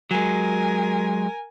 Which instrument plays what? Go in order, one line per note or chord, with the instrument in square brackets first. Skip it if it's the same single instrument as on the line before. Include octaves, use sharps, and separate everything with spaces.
[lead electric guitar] F#3 G#3 [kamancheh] A#4 G#5